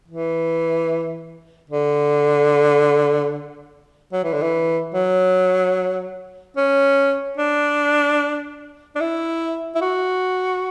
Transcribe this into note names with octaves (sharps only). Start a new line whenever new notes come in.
E3
D3
F#3
E3
D3
E3
F#3
C#4
D4
D4
E4
E4
F#4